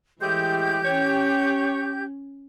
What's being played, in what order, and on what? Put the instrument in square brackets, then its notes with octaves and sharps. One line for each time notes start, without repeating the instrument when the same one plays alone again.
[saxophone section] A2 G#3 [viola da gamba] E3 [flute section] G4 G6
[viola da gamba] C#4 [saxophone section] C#5